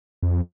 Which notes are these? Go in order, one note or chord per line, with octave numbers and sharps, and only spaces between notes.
F2